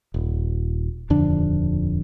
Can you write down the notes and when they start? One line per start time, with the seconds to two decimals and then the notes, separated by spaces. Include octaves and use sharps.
0.14 D#1
1.10 D#1 F2 D3 D4